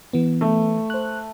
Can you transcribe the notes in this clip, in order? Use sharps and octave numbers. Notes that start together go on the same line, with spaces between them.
E3 B3
A3
C5 F#6